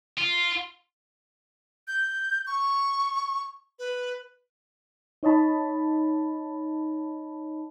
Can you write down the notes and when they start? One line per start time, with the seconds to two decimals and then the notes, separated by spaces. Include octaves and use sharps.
0.18 F4
1.88 G6
2.47 C#6
3.79 B4
5.23 D#4 C#5 D#5 A5 B5